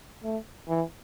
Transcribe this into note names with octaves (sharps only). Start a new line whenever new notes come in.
A3
E3